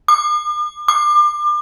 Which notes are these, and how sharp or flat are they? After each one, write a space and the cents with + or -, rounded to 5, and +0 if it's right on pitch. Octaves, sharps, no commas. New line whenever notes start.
D6 +45
D6 +35